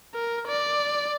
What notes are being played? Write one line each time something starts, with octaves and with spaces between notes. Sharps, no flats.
A#4
D5